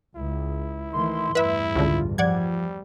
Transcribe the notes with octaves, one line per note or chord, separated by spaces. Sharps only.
C#2 E4
D#3 E3 A3 C6
A1 E2 G2 E4 B4 E5
C#2 D3 F4
F3 G3 D5 F#5 G#6